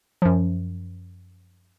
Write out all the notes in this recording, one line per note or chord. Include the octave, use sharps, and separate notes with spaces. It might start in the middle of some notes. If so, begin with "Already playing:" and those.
F#2 F3